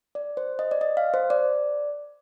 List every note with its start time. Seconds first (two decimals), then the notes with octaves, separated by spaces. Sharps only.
0.15 D5
0.37 C5
0.59 D#5
0.71 D5
0.81 D#5
0.97 F5
1.14 C5
1.30 D5